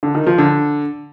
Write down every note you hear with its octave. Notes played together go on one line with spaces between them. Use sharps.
D3
D#3
F3
D3